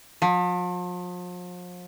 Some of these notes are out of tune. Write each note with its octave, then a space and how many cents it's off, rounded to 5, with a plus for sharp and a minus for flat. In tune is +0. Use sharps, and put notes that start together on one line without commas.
F3 +40